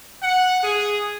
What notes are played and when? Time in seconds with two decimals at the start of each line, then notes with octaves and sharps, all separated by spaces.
0.22 F#5
0.63 G#4